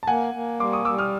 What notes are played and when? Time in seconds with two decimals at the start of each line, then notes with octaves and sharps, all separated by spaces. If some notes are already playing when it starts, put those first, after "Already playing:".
0.03 A5
0.07 A#3 F#5 G#5
0.34 A#3
0.60 G3 C6 D6
0.72 C#6 D#6
0.85 G3 D6 E6
0.98 D#6 F6